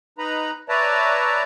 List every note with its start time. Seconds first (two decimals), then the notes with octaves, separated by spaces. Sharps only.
0.18 D#4 B4 A#5 B5
0.69 B4 C#5 D5 E5 A5 A#5